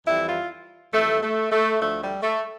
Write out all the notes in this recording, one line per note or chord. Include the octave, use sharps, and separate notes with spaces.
F2 E3 G3 E4
F4
F2 E3 G3 A3
A3
A3
D2 D3 F3 A3
G3
A3